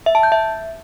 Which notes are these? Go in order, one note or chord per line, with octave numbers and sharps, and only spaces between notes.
E5
A5
G6
E5